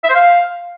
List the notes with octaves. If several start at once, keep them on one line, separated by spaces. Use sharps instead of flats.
E5
C5
F5